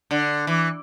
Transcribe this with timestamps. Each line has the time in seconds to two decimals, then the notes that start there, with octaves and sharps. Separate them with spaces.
0.11 D3
0.47 E3